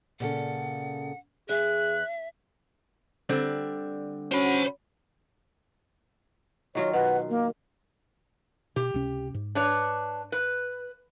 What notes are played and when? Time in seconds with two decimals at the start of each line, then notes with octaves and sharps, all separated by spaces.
0.20 A#2 C#3 A4 F#5
1.49 E2 G#4 E5 F#6
3.29 D3 G3 C4
4.32 C#4 F#4 C5 B5
6.75 D#3 F#3 F4 C#5
6.93 B2 B4 F#5
7.29 A#3 A#4
8.76 B2 G4
8.94 C#2 C3 C#4
9.34 G#2
9.55 D4 B4 C#5
10.32 B4